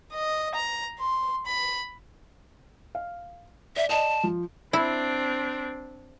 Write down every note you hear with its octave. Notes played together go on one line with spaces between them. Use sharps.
D#5
A#5
C6
B5
F5
D5 E5
D5 D#5 A5
F3
C4 D4 E4